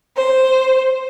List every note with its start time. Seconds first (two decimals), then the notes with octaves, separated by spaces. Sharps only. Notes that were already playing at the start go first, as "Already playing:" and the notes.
0.17 C5